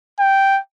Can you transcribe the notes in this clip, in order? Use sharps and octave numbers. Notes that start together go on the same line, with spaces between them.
G5